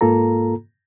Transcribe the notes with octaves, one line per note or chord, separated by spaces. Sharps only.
G#2 A#3 F4 A4 A#5